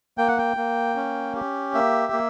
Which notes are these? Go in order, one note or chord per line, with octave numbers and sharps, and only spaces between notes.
A#3 G5
F#5
G5
A#3
C#4
G4
A#3 E5
A#3